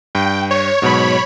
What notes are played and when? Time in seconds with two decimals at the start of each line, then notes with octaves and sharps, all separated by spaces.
0.15 G2 G5
0.51 C#5
0.82 G#2 B2 F#3 C#5 B5